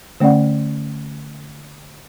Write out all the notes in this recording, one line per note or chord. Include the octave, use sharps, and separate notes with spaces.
D3 A3 C#4 D5 F#5